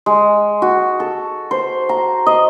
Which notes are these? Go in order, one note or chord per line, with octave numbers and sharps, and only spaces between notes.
G#3
F#4
A4
C5
A#5
D#5